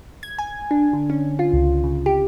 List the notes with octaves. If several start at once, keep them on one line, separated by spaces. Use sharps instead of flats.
G#6
G#5
D4
D3
C#4
F4
C#2
C#3
G4